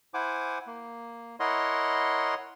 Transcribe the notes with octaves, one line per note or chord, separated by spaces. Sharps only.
E4 C5 F#5 G#5 D6
A#3
E4 A#4 C#5 D#5 F#5 C6